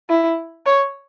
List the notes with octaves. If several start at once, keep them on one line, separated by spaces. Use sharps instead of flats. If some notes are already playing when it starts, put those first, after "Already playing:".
E4
C#5